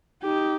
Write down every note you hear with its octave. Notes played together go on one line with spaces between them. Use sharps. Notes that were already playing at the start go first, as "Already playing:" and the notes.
D#4 G4